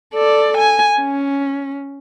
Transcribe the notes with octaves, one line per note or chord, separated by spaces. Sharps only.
A4 D5
G#5
C#4